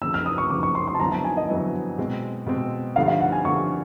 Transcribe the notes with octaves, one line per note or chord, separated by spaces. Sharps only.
F#1 F2 C#3 F3 E6
F6
D#6
C#6
F#1 F2 C#3 F3 D6
C#6
C6
C6
A5
F2 D3 F#3 B3 E4 A#5
A5
G#5
D#5
F2 D3 F#3 B3 E4
B2 G#3 C4
B2 G#3 C4
G1 G2 D3 F3 A3 F5
F5
F#5
G#5
G1 G2 D3 F3 A3 C#6